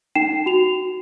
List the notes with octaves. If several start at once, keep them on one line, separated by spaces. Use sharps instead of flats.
D#4 G5 C7 E7
F#4 F7